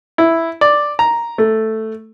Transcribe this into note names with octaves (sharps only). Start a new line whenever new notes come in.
E4
D5
A#5
A3